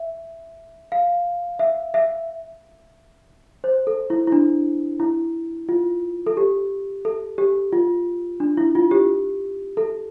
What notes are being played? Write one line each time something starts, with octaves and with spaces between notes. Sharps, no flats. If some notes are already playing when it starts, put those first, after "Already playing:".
Already playing: E5
F5
E5
E5
C5
A4
E4
E4
D4
E4
F4
A4
G4
A4
G4
F4
D4
E4
F4
G4
A4